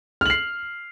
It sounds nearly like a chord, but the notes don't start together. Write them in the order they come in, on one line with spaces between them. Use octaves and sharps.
F6 F#7 C7